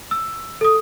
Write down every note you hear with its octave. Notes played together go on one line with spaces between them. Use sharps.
E6
A4 D#6